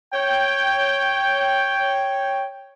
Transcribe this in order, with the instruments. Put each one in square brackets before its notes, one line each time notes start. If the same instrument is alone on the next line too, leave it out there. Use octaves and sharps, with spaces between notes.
[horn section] C#5 G5